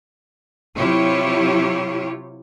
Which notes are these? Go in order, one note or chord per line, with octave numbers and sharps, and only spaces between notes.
C3 F#3 E4 F4 G4 C#5